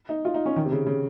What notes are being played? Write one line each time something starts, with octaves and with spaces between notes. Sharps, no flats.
D#4
F4
D#4
C#4
D#3
C3
C#3
C#3